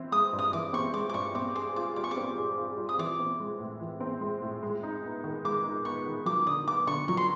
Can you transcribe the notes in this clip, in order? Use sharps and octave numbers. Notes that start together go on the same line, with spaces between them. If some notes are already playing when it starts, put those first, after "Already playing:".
Already playing: E3 C4
G#3 D#6
G2
D#6
E3 D6
C4 C#6
G#3 D6
D6
G2 C#6
C4 D6
G#4 D6
F4 D6
G3 D6
C#6
D6
C4
G#4
F4
G3
D#6
E3 D6
C4
G#3
A2
E3
C4
G#3
A2
G#3
D#4
B3
D#3
G#3 D6
D#4
B3 C#6
D#3
F#3 D6
D3 D#6
B3 D6
D3 C#6
F#3 C#6
C6